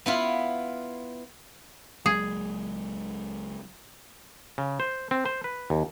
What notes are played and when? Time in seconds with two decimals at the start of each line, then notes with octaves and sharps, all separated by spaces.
0.06 B3 E4 F4
2.06 C#2 F#3 G#3 G#4
4.58 C#3
4.80 C5
5.11 C4
5.26 C5
5.44 B4
5.70 D#2